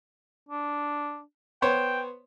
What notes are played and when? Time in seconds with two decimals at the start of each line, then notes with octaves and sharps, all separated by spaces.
0.49 D4
1.62 B3 C5 C#5 G5